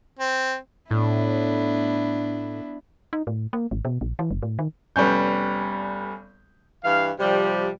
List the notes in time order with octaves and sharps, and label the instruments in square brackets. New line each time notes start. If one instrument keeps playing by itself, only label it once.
[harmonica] C4
[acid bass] A2 [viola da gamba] B3 D4 E4
[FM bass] D#4
A2
A#3
G#1
B2
A#1
E3
F#1
A2
D#3
[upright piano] F1 G3 B3 C#4 G6
[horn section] G2 E3 F5
C3 F3 G3